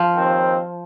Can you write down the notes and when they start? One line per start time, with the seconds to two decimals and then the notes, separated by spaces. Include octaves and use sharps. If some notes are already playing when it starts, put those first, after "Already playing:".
Already playing: F3
0.14 D#2 D#3 C4